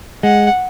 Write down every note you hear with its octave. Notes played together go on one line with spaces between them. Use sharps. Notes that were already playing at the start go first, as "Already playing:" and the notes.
G#3 F#5